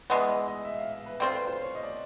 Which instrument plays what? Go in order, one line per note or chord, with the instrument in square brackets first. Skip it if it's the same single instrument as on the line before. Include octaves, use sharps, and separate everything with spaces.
[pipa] E3 G#3 B3 [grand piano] D5
[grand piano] D#5
D#5
E5
F5
E5
B4
[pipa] G3 C4 F4 [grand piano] A4
[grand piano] B4
C5
C#5
D#5
D5